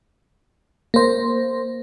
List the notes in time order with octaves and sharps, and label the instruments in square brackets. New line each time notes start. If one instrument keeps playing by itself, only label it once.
[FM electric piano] A#3 C5